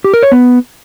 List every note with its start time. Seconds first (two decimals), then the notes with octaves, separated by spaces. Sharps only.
0.04 G4
0.13 A#4
0.23 C#5
0.32 B3